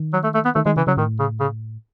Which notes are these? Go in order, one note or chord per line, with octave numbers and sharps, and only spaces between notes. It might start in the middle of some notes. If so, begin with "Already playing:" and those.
Already playing: D#3
F#3
A3
A3
B3
D#3 A3
D#3 G#3
C#3 E3
C#3 F#3
A2 D#3
C#3
C#3